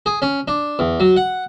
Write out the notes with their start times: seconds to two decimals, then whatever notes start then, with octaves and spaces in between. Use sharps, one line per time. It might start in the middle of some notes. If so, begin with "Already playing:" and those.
0.06 G#4
0.22 C#4
0.48 D4
0.79 E2
1.00 F#3
1.16 F#5